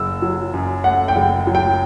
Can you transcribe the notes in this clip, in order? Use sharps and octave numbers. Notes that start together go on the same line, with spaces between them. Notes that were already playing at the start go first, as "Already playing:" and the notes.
Already playing: F#1 E6
F#3
F#2
A3 F#5
G5
F#1
F#3
G5